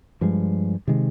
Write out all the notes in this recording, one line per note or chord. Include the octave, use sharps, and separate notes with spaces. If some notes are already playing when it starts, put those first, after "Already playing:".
G2 F3 G#3
C3 D#3 G#3